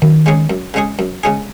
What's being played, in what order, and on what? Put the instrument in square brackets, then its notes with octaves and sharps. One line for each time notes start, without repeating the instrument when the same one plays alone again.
[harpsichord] F#2 [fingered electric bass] D#3
[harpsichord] C#3 G#3 C#4 G#4
F#2
C#3 G#3 C#4 G#4
F#2
C#3 G#3 C#4 G#4